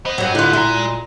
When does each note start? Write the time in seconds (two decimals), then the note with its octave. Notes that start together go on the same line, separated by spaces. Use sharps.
0.06 B3 C5 D#5
0.18 G2 F#3
0.35 D3 E4 F4 F#6 G6
0.53 A#2 G#3 E4 F#4 A#5